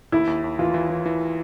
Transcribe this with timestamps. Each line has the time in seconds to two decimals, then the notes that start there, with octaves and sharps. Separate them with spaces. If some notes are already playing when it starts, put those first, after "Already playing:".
0.12 D#2 E4
0.27 D#2
0.44 D#2
0.59 E3 F4
0.74 E3
0.90 E3
1.06 E3